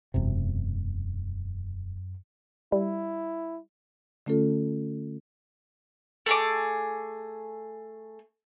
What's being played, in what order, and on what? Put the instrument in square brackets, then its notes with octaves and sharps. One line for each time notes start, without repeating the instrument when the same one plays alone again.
[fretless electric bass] E1 C3 [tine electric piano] F#2
[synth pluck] G3 [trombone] E4
[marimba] D3 A3 C#4 F4 A4
[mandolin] A3 G#4 D6